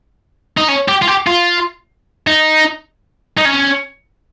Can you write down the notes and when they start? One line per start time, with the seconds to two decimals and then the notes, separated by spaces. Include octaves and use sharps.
0.57 D#4
0.68 C#4
0.89 G4
1.02 F4
1.08 G4
1.27 F4
2.27 D#4
3.38 D#4
3.46 C#4